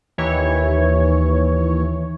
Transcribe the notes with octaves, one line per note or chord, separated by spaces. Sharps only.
D#2 E3 C#5